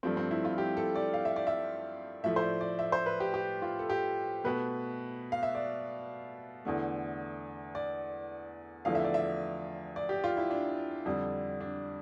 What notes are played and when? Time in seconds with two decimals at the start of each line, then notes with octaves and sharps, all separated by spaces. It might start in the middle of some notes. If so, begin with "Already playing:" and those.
0.03 G2 F3 A3 C4
0.17 C4
0.31 E4
0.45 F4
0.58 G4
0.77 A4
0.96 D5
1.14 F5
1.25 E5
1.36 D5
1.47 E5
2.24 A2 F3 A3 E5
2.36 C5
2.42 D5
2.61 D5
2.79 E5
2.92 C5
3.06 B4
3.20 G4
3.34 G4
3.62 F4
3.79 A4
3.90 G4
4.44 B2 A3 B4
5.32 F5
5.43 E5
5.55 D5
6.65 E2 D3 A3
7.75 D5
8.85 E2 D3 F3 A3 F5
8.95 E5
9.04 D5
9.14 E5
9.96 D5
10.09 G4
10.24 F4
10.37 E4
10.51 D4
11.06 F2 D3 G3
11.60 D4